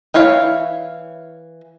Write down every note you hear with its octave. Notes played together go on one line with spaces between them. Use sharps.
E3 E4 C#5 F5